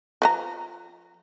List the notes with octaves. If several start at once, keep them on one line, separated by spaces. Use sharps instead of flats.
F3 B4 A#5